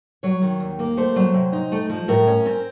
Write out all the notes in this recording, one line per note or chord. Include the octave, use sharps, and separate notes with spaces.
F#3 C#5
D#3
D#2
A#3
A3 C5
F#3
C3
D#4
A3
F3
A2 A#4
C#4
C4